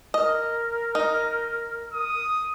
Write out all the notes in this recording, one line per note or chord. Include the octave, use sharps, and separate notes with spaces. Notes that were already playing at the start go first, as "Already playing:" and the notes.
A#4 D#5
D#4
D#6